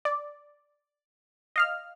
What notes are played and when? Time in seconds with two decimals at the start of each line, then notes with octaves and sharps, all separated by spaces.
0.05 D5
1.56 D#5 F5 F6